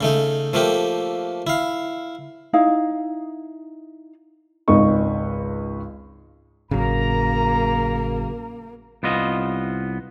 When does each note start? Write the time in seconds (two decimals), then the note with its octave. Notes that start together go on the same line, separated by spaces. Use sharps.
0.01 C#3 A3 D#4
0.53 F3 A3 A#3 G4
1.47 E4 F5
2.53 D#4 E4 F5
4.68 G#1 C#2 D#4 D#5 C#6
6.71 G#1 A2 C#3 F#3 A#3 A#4 A#5
9.03 C2 B3 F4 D#5